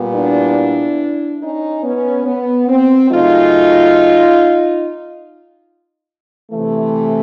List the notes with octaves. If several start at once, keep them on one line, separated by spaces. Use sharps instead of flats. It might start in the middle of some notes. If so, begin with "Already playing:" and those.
Already playing: A#2 G3 B3
D4 E4
C#4 D#4
B3 C#4
B3
C4
C#3 F#3 A3 D#4 F4
C3 E3 A3